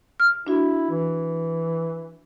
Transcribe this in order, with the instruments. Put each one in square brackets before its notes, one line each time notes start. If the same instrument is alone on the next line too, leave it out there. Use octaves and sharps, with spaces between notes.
[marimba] F6
[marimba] D4 F#4 [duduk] E4
[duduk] E3